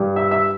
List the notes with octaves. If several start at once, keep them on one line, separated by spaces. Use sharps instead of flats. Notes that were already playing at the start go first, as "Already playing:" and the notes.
Already playing: G2 G3
E5
E5